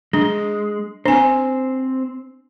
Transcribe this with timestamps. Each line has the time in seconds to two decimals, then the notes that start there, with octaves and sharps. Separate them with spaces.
0.13 G#3 D4
1.06 C4 D4 C5 G#5